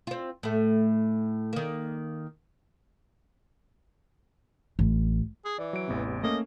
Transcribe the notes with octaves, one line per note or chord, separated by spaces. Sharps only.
C4 F4
A2 A3
D#3 A#3
A1
G#4
E3 D5
F#3 D7
A1 E2 C3
A3 A#3 C#4 D#5